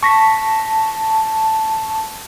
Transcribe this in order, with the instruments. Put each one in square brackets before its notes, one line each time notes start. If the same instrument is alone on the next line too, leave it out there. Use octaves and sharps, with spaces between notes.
[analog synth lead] A5 [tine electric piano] C#6 A#6 B6